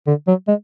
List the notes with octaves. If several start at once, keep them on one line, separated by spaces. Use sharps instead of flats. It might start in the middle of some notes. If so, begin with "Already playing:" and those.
D3
F#3
G#3